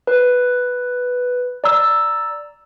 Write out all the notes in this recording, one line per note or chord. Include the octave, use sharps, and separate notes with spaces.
B4
D5 A#5 E6